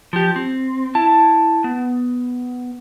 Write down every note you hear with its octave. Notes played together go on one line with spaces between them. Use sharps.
F3 G4
C4
E4 A5
B3